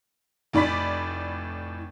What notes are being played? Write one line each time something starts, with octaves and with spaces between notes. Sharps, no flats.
F1 A2 D5 B5 B6